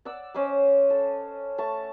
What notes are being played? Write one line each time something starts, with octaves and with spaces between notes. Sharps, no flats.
D5 F#5 E6
C#4 C5 D#5 D6
A4
A3 A5 C#6